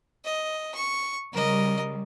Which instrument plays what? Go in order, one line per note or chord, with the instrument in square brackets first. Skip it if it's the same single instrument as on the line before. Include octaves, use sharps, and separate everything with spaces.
[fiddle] D#5
C#6
[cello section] C#3 G3 [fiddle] A#4 D#5